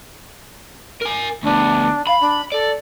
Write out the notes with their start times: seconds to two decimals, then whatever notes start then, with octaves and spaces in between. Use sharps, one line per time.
1.01 A#4 G#5
1.43 D2 B3 D4
2.07 F5 B5
2.21 D4
2.52 A4 D5